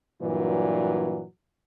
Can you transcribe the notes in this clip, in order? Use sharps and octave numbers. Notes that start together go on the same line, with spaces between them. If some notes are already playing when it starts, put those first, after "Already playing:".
G2 A#2 E3 F#3